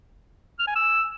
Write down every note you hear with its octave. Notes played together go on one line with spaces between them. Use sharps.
F6
G#5
E6